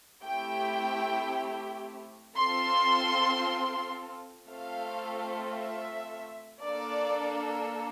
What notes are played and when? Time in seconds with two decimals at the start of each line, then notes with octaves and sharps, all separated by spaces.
0.24 A3 C4 E4 G4 G5
2.36 C4 F4 A4 C6
4.49 A3 C4 F4 A4 F5
5.56 E5
6.62 A#3 D4 A4 D5